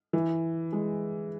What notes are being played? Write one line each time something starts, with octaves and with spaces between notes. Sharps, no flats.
E3
G#3